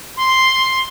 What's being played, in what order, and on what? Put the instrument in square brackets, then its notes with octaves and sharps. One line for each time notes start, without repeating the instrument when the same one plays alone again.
[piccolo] C6